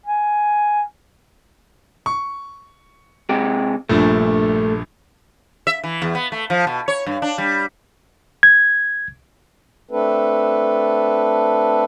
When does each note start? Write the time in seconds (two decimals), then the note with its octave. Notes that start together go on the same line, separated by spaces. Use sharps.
0.06 G#5
2.06 C#6
3.29 C3 G#3 G4
3.89 A#1 G2 A#2 A3
5.67 E5
5.84 E3
6.02 E2
6.15 B3
6.32 A3
6.50 F3
6.67 B2
6.88 C#5
7.07 G2
7.22 D4
7.38 G3
8.43 G#6
9.91 A3 C4 D4 A4 B4